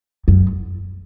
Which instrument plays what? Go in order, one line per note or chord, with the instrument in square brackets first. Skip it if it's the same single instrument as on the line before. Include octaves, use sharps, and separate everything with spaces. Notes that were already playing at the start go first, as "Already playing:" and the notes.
[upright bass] F#2